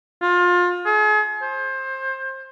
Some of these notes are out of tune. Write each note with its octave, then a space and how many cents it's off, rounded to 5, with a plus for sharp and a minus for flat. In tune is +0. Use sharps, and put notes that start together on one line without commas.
F4 +25
G#4 +40
C5 +25